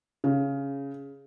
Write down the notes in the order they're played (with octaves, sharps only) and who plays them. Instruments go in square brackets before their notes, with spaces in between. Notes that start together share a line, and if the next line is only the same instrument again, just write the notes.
[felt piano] C#3